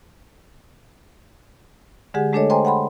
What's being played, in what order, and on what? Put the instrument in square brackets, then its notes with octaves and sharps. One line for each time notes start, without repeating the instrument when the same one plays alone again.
[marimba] D3 G#3 G4 G#4 F#5
G#3 A3 D4 A4 C#5 D#5
C5 D#5 G5 G#5 A#5 C6
F#5 G5 B5 C6